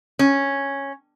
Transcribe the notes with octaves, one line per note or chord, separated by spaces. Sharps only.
C#4